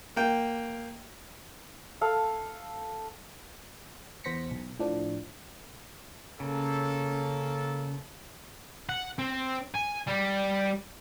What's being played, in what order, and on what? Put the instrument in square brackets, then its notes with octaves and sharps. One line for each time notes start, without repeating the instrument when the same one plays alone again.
[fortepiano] A#3 G5
[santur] A4 F5
[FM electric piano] E2 B3 C5 A#6 B6 C#7
B1
A2 F3 D4
[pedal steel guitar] C#3 [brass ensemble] A#3 C#4 A4
[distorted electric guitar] F#5
C4
G#5
G3